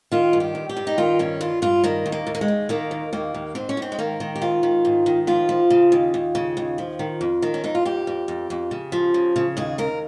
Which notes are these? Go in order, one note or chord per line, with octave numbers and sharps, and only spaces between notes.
D#3 F4
G2
G4
G2
G4
G2
D#4
D#3 F4
G2 C#4
G2 F4
G2 F4
D#3 A#3
D#2
A#3
D#2
A#3
G#3
D#2
D#3 A#3
D#2
D#2 A#3
D#2
G#2 C4
C#4
G#2 C4
G#3
D#3 A#3
D#3
G4
G#2 F4
D#3
G#2
D#3
F3 F4
F3
C#3
D#2
D#2
C#3
D#2
F3
D#3
F2
D#3
C#4
F2 D#4
F4
F2 G4
F2
F2
F2
C#3
F3
C#3
C#3
D#2 G#4
D#2 A#4